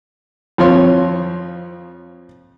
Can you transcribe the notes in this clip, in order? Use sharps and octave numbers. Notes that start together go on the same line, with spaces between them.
F2 F3 C4 C#5 C6